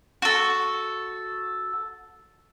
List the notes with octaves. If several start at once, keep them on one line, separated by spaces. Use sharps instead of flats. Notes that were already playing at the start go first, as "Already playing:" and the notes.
F#4 A4